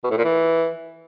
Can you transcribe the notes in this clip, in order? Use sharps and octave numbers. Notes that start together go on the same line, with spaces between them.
B2
A2
A#2
E3